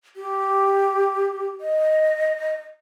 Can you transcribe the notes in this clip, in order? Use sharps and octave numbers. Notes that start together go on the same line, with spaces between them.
G4
D#5